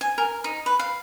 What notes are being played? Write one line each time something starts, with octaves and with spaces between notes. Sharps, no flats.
G#5
A#4
D#4
B4
F5